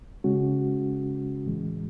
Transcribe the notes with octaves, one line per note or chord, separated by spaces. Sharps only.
C#3 G#3 C#4 F#4
A2 E3 G#3